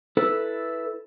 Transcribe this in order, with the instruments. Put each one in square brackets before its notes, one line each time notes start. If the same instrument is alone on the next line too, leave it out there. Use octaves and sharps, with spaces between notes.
[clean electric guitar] E4 A4 B4